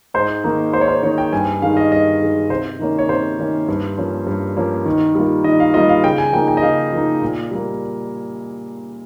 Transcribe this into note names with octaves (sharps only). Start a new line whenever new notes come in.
G#2 C5
D#3 A#3 D#4
G#2 C5
C#5
C5
D#3 A#3 D#4 C#5
G5
G2 G#5
D#3 G#3 F5
D#5
G2 D#5
D#3 G#3
C3 C5
D#3 A#3 C#4
C#5
C3 C5
D#3 A#3 C#4
G2
F3 A#3 C#4
G2
F3 A#3 C#4
D#3
G3 A#3 F4
D#3 D#5
F5
G3 A#3 F4 D#5
F5
C#3 G5
G#5
F3 A#3 D#4 G5
G5
D#5
C#3 F5
F3 A#3 D#4
A#2
G3 A#3